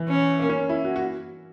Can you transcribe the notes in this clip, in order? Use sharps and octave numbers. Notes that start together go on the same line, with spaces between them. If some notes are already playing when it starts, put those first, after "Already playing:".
Already playing: E3
C#4
A#3
C#4
E4
F#4
F#4